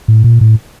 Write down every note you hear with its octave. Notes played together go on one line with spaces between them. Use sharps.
A2
A#2
A2